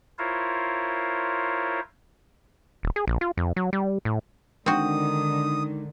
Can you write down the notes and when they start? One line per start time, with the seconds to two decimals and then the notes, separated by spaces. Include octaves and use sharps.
0.19 E4 F4 A#4 C5 C#5
2.83 D#1
2.96 G#4
3.07 A#1
3.21 F4
3.37 F2
3.56 F#3
3.73 G3
4.05 A2
4.66 D3 D#3 G#3 C4 D4 D#4 F#4 D#6